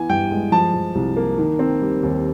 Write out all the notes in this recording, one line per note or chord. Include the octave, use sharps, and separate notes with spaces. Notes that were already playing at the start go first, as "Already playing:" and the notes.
Already playing: E3 B3 G#5
G2 G5
G#3
F3 A5
F3
C2
A#3
D#3
C4
G3
D#2